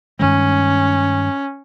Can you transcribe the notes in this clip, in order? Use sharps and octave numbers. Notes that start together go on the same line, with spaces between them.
G2 D#3 G#3 C#4